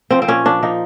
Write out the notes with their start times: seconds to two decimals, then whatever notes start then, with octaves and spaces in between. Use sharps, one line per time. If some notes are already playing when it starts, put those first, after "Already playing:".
0.11 F3 C4
0.22 C4
0.28 A#2 C#4
0.45 F3 D4
0.63 F3 D#4